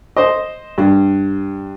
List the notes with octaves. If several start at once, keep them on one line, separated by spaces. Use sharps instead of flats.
C5 D#5
G2